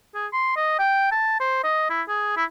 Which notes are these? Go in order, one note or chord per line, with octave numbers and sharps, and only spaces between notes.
G#4
C6
D#5
G5
A5
C5
D#5
E4
G#4
E4